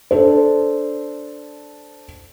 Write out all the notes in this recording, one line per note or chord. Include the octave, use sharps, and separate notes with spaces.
D4 A4 C5